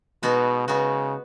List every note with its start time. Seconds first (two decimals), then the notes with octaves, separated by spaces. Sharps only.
0.23 B2 G#3 B3 D#4 F#4
0.67 C#3 G#3 B3 D#4 F#4